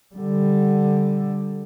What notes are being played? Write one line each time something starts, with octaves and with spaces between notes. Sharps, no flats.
D3 G3